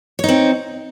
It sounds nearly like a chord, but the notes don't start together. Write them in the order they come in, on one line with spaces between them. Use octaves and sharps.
C#5 D#4 C4